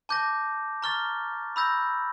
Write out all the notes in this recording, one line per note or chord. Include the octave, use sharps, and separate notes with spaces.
A5 D6 G6 A#6
A#5 C#6 F6 A6
B5 E6 G6 A#6